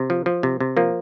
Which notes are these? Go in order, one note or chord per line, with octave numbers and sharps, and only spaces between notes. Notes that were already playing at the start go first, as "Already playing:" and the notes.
Already playing: C3
F3
F3
C3
C3
F3 A#3